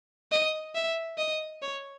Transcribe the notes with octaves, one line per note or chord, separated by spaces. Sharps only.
D#5
E5
D#5
C#5